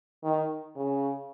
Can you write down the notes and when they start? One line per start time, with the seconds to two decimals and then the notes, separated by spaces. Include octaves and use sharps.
0.23 D#3
0.76 C#3